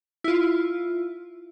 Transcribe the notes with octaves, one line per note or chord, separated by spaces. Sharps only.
E4 F4